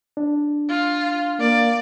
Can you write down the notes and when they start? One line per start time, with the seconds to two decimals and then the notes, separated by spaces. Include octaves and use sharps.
0.17 D4
0.69 F4
1.40 A#3 D5